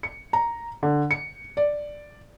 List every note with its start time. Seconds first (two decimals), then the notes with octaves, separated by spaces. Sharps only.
0.03 C#7
0.33 A#5
0.83 D3
1.11 C#7
1.57 D5